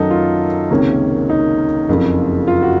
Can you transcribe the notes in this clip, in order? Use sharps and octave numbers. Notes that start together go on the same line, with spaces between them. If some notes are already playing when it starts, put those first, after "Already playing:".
Already playing: F#2 D#3 F#3 A3 D#4 A4
F4
C#2 C3 D#3 A#3 C#4
D#4
F#1 F2 C#3 F3
F4
F#4